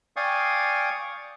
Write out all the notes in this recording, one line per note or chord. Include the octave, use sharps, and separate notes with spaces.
D5 F5 G5 G#5 C#6 D#6